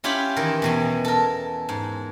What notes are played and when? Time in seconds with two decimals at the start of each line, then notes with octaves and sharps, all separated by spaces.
0.04 C#4 E4 F4 G4 C#5 B5
0.36 D#3 E3 A#4
0.62 E2 B2 G#5
1.05 A4 A#4
1.69 G#2